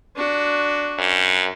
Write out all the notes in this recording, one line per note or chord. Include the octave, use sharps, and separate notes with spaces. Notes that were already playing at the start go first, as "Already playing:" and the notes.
D4 F#4
F#2